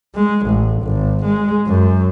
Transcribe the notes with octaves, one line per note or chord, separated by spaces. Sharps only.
G#3
A1
G#1
G#3
F#2